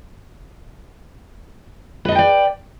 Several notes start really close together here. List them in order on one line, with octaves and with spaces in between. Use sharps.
B4 D#5 A5 G5 D5